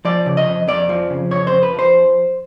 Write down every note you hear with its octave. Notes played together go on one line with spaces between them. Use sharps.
F3 D5
C#3
D#5
F2
F2 D5
F3
C#3
F2 C#5
C5
F2
B4
F3
C5